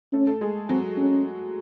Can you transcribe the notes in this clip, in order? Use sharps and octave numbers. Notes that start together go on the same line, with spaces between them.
A3 C#4 A4
A3 A4
G#3 G#4
F#3 C4 F#4
C#4